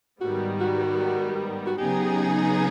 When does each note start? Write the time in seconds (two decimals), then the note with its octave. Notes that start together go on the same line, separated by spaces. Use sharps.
0.21 G#2 D#3 G3 B3 F#4
0.60 F#4
1.66 F#4
1.78 C#3 F#3 B3 D#4 G4 G#4